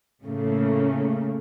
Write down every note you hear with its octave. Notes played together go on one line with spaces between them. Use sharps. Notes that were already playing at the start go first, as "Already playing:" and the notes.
A2 C#3 A3 A#3